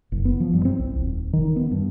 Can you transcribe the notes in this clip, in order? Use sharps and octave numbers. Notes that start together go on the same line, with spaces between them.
F#1
B3
F3
G2
C4
C2
D#1
D#3
B3
G2